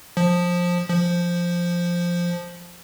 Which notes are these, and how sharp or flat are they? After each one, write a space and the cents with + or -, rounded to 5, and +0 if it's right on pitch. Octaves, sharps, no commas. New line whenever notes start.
F3 +15
F3 +0